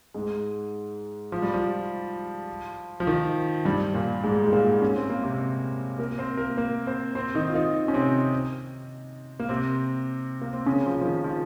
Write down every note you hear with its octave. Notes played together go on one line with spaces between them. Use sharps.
G#2 G#3
F3
G3
F3
F3
D#3
G2 G3
A#2 A#3
G#2 G#3
G#3
A#2 A#3
C#4
C4
A#3
C3 C4
A#3 A#4
C4 C5
A#3 A#4
A#3 A#4
C4 C5
C4 C5
D#3 D#4
F4
D#3 D#4
C#4
C3 C4
A#3
C3 C4
A#3
C4
C#3 C#4
F3
F3
D#3
F3